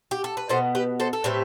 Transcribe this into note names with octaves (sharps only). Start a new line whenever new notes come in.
G4
A4
B4
B2 B3 A4 C5
G4 B4
A4 C5
A4
A2 G3 C4 G4 B4